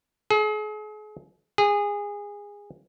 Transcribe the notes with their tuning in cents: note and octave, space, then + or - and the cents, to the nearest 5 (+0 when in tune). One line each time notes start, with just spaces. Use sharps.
G#4 +40
G#4 -20